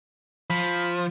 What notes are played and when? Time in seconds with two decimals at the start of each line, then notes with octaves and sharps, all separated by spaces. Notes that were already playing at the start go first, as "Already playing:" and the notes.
0.50 F3 B5